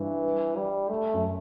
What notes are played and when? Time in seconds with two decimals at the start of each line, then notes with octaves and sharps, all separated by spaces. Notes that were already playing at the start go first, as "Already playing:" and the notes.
Already playing: G2 E3
0.56 G3
0.90 A3
1.14 F#2